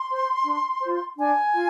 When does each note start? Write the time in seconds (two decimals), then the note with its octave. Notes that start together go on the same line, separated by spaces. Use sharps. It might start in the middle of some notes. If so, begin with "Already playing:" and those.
Already playing: C6
0.10 C5
0.46 D4
0.81 F4 C5
1.18 D4 G#5
1.53 F4